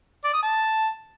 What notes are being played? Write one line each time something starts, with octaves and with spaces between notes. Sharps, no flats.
D5
D#6
A5